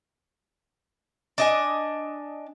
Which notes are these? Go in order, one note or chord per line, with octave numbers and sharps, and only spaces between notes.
D4 D#5 G#5